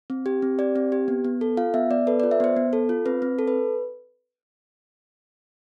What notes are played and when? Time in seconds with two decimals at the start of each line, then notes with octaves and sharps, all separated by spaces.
0.10 C4
0.26 G4
0.42 C4
0.59 G4 D5
0.76 C4
0.92 G4
1.08 B3
1.25 B3
1.41 A4
1.57 F4 F5
1.74 B3 E5
1.90 B3 D5
2.07 A4 B4
2.20 D5
2.23 F4
2.31 E5
2.40 B3 C5
2.56 B3
2.73 A4
2.89 F4
3.06 C4 B4
3.22 C4
3.39 A4
3.47 B4